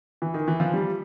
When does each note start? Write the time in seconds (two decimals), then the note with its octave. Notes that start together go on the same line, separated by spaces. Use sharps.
0.22 E3
0.34 D#3
0.48 E3
0.60 F3
0.74 G3